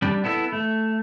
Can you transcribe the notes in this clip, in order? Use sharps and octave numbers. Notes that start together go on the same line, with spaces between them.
G3 D4 G4
B3 E4 A4 E5
A3